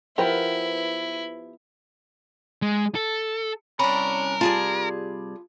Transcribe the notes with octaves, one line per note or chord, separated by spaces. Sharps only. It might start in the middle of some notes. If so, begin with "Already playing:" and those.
F3 B3 E4 G4 A#4 B4
G#3
A4
C2 C#4 D4 A#4 B5
G3 F4 G#4 A5